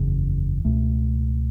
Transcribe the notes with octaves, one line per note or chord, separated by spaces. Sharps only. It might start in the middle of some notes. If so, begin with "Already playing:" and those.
Already playing: F#1 E2 C#3
C#2 B2 A3